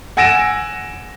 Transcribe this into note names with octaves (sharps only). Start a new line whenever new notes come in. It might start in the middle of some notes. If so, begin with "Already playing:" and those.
F#5 G#5 E6 A#6 D7 E7